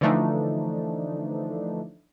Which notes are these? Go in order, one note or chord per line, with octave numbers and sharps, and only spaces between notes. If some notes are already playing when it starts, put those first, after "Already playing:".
D3 E3 F3 A3 D4 D#4